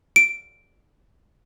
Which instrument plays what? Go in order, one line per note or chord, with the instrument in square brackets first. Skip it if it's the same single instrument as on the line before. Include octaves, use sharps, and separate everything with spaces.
[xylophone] D7